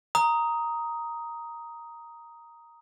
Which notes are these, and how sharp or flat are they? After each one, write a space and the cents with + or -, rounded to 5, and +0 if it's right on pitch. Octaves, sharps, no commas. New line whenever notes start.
A#5 +0 D#6 +10